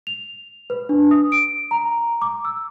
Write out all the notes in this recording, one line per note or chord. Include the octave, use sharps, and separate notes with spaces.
F7
B4
D4
D#6
D7
A#5
D6
E6